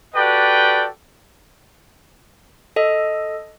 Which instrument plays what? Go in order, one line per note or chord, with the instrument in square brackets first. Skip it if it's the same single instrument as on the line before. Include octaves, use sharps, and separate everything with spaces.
[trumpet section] F#4 G4 A4 B4 D5 G5
[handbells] A4 D#5